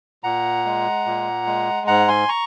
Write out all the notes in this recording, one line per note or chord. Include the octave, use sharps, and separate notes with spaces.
A#2 F#5 A#5
G#3
A#2
G#3
G#2 F#5 A#5
G#5 C6
A#5 C#6